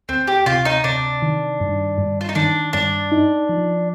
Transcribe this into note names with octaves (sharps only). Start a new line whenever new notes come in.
D2 C4
G4
C3 F4
D#4
C3 D4
D#3
G2
G2
F4
D#4
D#3 D4
G2 D4
D#4
F3